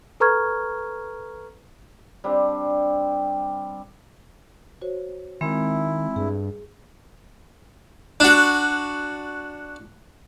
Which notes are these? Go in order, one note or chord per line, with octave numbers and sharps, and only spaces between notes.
A4 B4 A#5 C#6 F6 G#6
G3 C4 D4
F#4 C5 C#5
D#3 G#3 C4 E4 E5
G2 G#4
D4 F#4